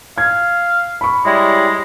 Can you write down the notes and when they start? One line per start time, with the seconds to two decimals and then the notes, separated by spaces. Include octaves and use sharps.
0.18 F5 G#6
1.01 B5 C#6
1.25 G3 G#3 E4 C#5